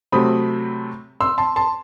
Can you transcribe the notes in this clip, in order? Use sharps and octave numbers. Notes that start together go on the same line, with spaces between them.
C3 F#3 A3 C4 B5 D#6
C6 E6
A5 C6
A5 C6